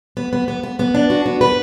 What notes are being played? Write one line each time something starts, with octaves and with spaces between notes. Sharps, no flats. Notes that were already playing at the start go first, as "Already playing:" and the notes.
B3
B3
B3
B3
B3
D4
F#4
B3
B4